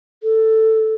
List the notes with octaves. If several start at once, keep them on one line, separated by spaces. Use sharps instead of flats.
A4